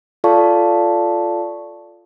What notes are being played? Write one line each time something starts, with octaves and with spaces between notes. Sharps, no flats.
F4 A4 D5 F5 A5 C#6